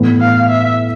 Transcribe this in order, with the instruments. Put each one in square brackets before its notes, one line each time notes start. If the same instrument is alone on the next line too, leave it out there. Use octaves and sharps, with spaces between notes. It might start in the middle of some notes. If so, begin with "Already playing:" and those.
Already playing: [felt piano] A2 E3 B3
[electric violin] F5
E5